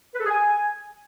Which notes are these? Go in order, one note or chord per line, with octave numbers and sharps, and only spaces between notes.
B4
A4
G#4
G#5